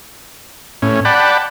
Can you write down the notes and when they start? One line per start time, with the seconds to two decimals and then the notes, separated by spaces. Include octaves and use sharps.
0.82 A2 C#4
1.05 D5 F#5 G5 A5 B5